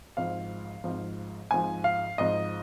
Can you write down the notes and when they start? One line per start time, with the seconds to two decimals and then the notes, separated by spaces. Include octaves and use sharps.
0.17 G#1 G#2 F3 F5
0.84 G#1 G#2 F3
1.51 G#1 G#2 F3 G#5
1.84 F5
2.18 G#1 G#2 F3 D#5